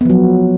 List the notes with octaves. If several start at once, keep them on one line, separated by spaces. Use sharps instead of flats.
F3 F#3 B3